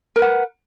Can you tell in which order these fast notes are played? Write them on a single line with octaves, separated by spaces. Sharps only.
A#4 B4 F#5